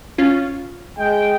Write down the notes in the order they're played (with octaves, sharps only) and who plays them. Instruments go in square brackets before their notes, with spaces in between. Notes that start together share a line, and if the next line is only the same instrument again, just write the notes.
[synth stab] C#4 F4
[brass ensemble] G#3 G5